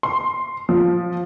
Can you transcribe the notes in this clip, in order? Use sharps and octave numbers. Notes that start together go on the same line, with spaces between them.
C6
F3